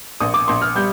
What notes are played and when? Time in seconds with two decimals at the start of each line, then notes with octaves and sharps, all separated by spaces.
0.20 A#1 D#6
0.34 D6
0.48 A#1 C6
0.62 F6
0.75 G3 G6